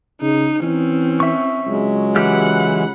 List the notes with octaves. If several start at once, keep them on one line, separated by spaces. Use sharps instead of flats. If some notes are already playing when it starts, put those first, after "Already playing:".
C#3 D#4
E3 C4 C#4
E5 C#6
C#2 F#3 G#3
E3 G4 F#5 B5 F6